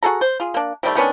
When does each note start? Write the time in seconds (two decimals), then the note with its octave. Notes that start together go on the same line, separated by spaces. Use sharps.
0.03 F#4 G#4 A4 A#5
0.21 C5
0.40 F4 G#4
0.54 A#3 D4
0.83 C3 D#3 G3 A3
0.95 D#3 B3 C#4 D4